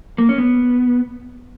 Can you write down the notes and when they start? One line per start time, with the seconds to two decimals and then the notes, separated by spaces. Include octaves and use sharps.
0.18 A#3
0.29 C#4
0.38 B3